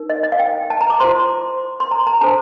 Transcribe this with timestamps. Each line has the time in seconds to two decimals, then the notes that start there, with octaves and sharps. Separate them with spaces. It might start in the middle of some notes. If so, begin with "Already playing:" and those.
Already playing: D#4 A#4
0.10 D#5
0.23 D#5
0.32 F5
0.40 G5
0.70 A5
0.81 A#5
0.90 D6
1.00 F4 C5 C6
1.80 C6
1.91 A#5
2.07 A#5
2.21 D4 A4 C5 A5